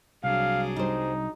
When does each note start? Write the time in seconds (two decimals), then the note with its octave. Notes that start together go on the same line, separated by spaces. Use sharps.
0.24 C2 F#3 D4 G#4 F5
0.76 G3 D#4 C5